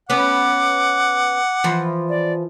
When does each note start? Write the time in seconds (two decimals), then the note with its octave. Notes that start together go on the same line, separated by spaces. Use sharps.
0.10 B3 C#4 B4 F#5 D6
1.64 E3 F3
2.09 D5